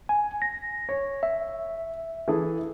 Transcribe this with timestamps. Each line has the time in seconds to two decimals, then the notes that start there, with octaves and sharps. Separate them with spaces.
0.09 G#5
0.42 A#6
0.89 C#5
1.23 E5
2.28 E3 G#4 A4